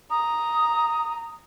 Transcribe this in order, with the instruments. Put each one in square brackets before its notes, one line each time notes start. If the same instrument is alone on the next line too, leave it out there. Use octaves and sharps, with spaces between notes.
[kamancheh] A#5 [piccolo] D#6